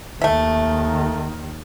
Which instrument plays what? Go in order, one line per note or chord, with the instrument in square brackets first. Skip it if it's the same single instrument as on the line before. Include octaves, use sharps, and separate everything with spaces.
[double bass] D#2 D#3 [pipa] A3 E5